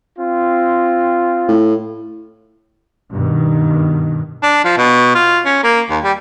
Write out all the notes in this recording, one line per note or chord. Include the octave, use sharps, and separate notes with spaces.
C4 F4
A2
G2 B2 D#3
D4
F3
B2
F4
C#4
A#3
D#2
G3